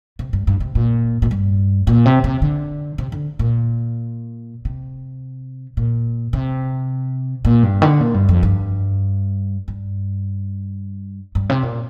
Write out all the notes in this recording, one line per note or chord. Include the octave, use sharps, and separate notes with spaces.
C3
G2
G2
C3
A#2
A#2
G2
A#2
C3
C3
D3
C3
D3
A#2
C3
A#2
C3
A#2
G2
D3
A#2
G2
F2
G2
G2
G2
C3
A#2